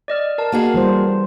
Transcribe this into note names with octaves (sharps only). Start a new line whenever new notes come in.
D5 D#5 F6
A#4 A5
A#3 F#4 G#4
E3 G3 C5